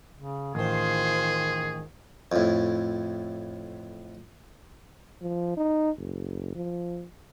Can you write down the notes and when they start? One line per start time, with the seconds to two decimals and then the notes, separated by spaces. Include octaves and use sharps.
0.16 C#3
0.55 A1 D#3 F4 G#4 C5
2.32 F2 A2
5.22 F3
5.57 D#4
5.98 F#1
6.55 F3